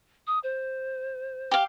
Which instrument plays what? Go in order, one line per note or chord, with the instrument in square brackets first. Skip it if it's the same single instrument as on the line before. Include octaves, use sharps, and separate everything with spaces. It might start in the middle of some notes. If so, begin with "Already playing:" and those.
[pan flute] D#6
C5
[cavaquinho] G4 F5